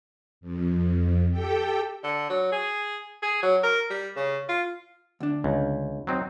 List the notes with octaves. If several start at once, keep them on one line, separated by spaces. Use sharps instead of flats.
F2
G4 A4 G5
D3
F#3
G#4
G#4
F#3
A#4
G3
C#3
F4
D2 D4
C#2
F#3 C4 D#4